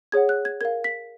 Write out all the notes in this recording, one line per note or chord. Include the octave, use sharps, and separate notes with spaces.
G#4 C#5 F#5 G#6
F#6
G#6
A#4 F5 G#6
B6